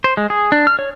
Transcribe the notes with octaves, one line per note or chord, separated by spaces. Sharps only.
C5
G#3
G#4
D4
F6
C#5